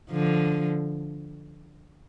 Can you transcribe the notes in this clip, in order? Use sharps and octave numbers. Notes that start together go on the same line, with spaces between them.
D3 F3